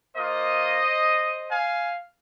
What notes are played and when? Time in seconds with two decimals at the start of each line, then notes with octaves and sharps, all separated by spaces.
0.16 A#3 F4 C5 D#5
1.50 F5 G#5